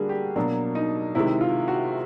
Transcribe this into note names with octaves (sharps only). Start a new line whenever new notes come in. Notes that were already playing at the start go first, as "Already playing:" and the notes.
Already playing: D3 G3 A#3 F#4 G#4
G4
B2 F#3 A#3 D4
D#4
C3 D#3 G#3 E4
F4
F#4